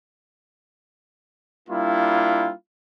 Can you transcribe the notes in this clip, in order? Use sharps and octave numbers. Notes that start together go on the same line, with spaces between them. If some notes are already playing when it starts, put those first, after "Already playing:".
G3 A#3 D4 E4 F4